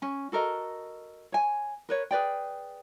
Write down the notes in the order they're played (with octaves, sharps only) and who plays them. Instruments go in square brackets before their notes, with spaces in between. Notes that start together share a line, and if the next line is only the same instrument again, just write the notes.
[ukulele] C#4 G#5
F#4 A4 A#4 D#5
C#5 G#5
A#4 B4 C#5
G#4 B4 D5 G5